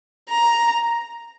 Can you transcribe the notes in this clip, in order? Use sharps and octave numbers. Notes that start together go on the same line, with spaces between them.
A#5